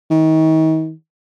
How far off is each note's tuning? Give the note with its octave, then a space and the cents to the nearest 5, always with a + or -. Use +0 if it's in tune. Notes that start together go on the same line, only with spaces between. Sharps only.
D#3 +35